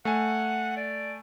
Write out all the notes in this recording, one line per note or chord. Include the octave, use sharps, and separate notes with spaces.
A3 F#5 G#5
D5